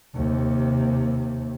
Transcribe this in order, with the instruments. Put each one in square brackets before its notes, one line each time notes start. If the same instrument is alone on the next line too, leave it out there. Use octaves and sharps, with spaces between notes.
[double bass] D#2 C3